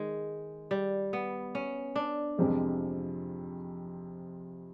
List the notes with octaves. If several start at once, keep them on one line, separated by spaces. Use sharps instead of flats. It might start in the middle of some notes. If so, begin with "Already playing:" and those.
Already playing: D#3 G#3
G3
B3
C#4
D4
F2 C3 F3 G#3